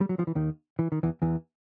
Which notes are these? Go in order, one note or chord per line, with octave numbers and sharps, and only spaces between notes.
G3
F#3
F3
E3
D#2 D#3
E3
D#3
E2 E3
E2 E3